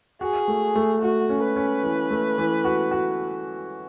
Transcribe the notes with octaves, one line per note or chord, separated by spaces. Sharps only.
F#4 G#4
A3
A3
A3 F#4
C#4
B4
C#4
E3
A3
E3
F#4
F#4